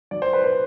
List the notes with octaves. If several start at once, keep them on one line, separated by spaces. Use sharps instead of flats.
F#3 D5
C5
B4
C5